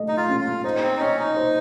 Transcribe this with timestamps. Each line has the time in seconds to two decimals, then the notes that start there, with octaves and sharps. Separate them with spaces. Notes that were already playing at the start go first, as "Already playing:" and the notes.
Already playing: A3 D#5
0.08 D#4
0.17 F4
0.29 C#4
0.40 F4
0.64 D#4 C5
0.83 C4
0.97 D#4
1.01 C#4 D#5
1.19 D#4
1.37 C5